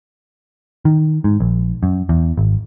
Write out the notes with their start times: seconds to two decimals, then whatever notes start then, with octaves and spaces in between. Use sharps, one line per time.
0.85 D#3
1.24 G#2
1.40 A#1
1.83 F#2
2.09 E2
2.38 G#1